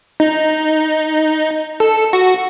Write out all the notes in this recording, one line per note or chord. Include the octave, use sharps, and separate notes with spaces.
D#4
A4
F#4